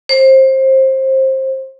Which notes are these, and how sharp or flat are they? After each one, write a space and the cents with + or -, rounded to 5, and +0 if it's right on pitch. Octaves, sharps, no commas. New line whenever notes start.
C5 +20